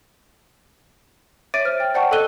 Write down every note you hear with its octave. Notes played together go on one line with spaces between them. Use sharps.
C#5 E5 D6 A6 D7 D#7
C5 F6
G5
C5 D5 F#5 G5 A5 C#6
A4 D#5 D6 F#6 D#7 G7